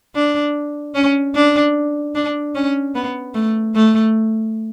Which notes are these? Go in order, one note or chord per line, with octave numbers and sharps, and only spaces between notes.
D4
C#4
D4
D4
C#4
B3
A3
A3